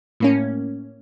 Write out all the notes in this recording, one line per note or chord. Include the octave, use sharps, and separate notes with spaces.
A2 A#3 C#4